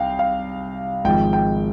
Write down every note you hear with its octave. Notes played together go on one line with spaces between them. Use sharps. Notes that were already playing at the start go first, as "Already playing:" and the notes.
Already playing: C2 F5 G5
F5
G#1 G#2 F3 G5
G5